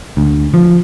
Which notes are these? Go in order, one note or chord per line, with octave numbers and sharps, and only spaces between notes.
D2
F3